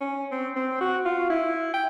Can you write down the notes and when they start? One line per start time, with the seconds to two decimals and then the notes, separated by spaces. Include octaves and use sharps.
0.01 C#4
0.32 C4
0.56 C4
0.81 F#4
1.05 F4
1.30 E4
1.74 G5